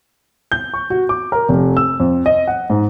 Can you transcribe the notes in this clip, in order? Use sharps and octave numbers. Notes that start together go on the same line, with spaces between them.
G6
C#6
F#4
D6
A#4
F1
E6
F2
D#5
F#5
G#2